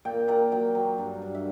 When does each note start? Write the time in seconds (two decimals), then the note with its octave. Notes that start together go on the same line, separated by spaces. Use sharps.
0.05 A#2 G5
0.28 A#2 A#5
0.52 F#3 G5
0.75 F#3
0.98 G2
1.22 G2
1.35 E5